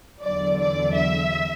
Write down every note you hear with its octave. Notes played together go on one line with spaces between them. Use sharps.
E2 D3 F#3 D5
D5
E5